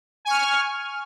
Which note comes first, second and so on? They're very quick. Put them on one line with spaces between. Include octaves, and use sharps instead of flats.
G#5 C#6 F6